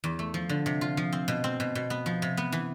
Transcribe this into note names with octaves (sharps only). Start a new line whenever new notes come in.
E2
A3
F3
D3
C3
F4
F3
C4
B2
C4
B2
B2
B3
F3
C3
B3
E3